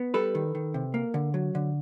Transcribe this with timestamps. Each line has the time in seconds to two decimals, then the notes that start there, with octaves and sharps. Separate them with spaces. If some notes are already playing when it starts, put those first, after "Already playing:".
Already playing: B3
0.14 G3 A4 B4
0.35 D#3
0.55 D#3
0.74 C3
0.94 A#3
1.14 D3
1.34 F#3
1.55 D3